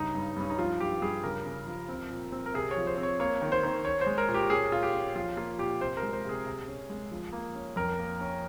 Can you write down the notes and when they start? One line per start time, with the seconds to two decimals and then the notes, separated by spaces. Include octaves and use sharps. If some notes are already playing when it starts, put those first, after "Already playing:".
Already playing: G2 C#3 D#4
0.15 G2
0.36 G2 C#4
0.50 D#4
0.58 F3 F4
0.80 G2 G4
1.02 G2 G#4
1.24 C#3 A#4
1.46 C#3
1.67 F3
1.89 C4
2.11 A#2
2.32 C4
2.46 A#4
2.54 C3 G#4
2.71 C#5
2.76 F3
2.87 C5
2.97 C4
3.03 C#5
3.20 A#3 C#5
3.42 D#3
3.52 C5
3.63 D#3
3.85 C#4 C#5
4.01 C5
4.06 G#3
4.18 A#4
4.29 A#2
4.34 G4
4.50 C#4 G#4
4.71 A#2 F4
4.83 G4
4.94 C#4
5.15 F3 F4
5.37 A#3 F4
5.58 A#2 G4
5.81 C3 C5
5.97 A#4
6.03 G#3
6.13 C5
6.25 C3 G#4
6.46 C3
6.68 C#4
6.90 G#3
7.11 F3
7.32 A#3
7.55 C#4
7.76 F2 A#4
7.98 A#3
8.20 C#4